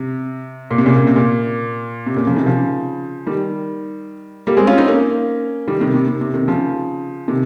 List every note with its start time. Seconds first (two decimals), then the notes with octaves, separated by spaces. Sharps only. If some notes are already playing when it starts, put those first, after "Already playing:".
Already playing: C3
0.71 A#2
0.78 C3
0.86 A#2 C#3
0.96 A#2 C#3
1.07 C3
1.16 A#2
2.06 C3
2.16 A#2 C#3
2.27 C#3 F3
2.36 C3 D#3
2.46 C#3 F3
3.27 D#3 G3
4.47 G3 A#3
4.57 G#3 C4
4.67 C#4 F4
4.78 C4 D#4
4.87 A#3 C#4
5.68 D#3 G3
5.81 C3 D#3
5.94 C3
6.08 C3
6.21 C3
6.34 C3 D#3
6.48 C#3 F3
7.28 C3 D#3